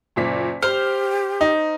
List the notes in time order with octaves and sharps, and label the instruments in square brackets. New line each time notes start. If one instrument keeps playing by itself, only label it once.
[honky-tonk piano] F#1 A#2 B6
[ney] G4 [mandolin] C5 [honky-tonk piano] F6
[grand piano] D#4